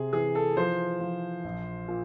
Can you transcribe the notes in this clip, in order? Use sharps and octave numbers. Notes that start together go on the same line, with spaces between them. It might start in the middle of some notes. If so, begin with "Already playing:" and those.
Already playing: C3 G#4
E3 G#4
A4
F3 C5
F3
A#1
A#2